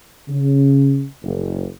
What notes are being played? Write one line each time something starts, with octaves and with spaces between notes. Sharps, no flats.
C#3
F#1